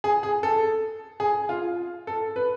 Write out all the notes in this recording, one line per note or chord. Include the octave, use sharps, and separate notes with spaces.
G#4
G#4
A4
G#4
F4
A4
B4